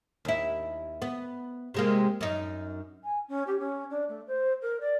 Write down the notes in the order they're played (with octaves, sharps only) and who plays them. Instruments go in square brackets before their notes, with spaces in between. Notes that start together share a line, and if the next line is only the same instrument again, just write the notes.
[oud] D#2 E4
B3
C3 G#3 A#3
F#2 D#4
[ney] G#5
C#4
G4
C#4
D4
A3
C5
A#4
D5